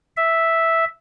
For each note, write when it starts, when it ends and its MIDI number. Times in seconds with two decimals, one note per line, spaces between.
0.17 0.85 76